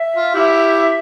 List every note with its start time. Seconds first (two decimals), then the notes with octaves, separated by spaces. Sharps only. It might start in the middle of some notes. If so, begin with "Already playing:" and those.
Already playing: E5
0.17 F4
0.34 E4 G4